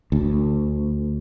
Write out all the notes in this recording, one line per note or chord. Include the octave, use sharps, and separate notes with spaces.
D2